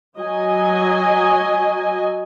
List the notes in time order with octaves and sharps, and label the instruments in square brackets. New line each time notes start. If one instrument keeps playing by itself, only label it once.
[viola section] F#3 D#5 G#5